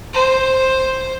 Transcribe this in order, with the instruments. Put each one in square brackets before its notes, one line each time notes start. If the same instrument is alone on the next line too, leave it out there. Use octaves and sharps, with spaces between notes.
[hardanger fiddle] C5